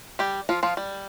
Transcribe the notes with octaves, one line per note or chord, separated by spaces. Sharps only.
G3 G4
F3 F4
F3 F4
G3